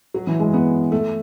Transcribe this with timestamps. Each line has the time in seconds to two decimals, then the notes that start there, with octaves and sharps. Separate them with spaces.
0.14 F#3
0.27 E3
0.39 G#3
0.53 B3
0.92 A3